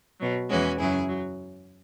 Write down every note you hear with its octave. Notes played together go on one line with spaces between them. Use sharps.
B2 F#3
E2 E3 G#3 C#4 F#4
F#2 C#3 F#3 E4 G#4
F#3